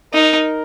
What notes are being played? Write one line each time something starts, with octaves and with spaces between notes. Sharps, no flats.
D#4 A#4